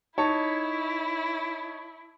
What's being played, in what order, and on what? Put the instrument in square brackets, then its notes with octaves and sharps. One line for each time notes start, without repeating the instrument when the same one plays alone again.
[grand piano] D#4 C#5 A5 [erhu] E4